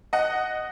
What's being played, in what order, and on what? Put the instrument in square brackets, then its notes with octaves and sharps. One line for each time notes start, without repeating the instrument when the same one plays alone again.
[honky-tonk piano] D#5 F#5